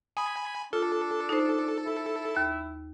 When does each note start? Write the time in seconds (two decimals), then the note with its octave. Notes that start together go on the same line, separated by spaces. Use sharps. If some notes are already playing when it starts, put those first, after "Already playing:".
0.17 G#5 B5 D#6
0.73 D4 F4 A4
1.29 D#4 C5
1.86 E4
2.37 D#2